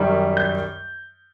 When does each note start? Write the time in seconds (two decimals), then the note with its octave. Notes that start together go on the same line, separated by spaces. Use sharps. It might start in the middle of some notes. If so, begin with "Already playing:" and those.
Already playing: F#2 D#3 G3
0.37 G6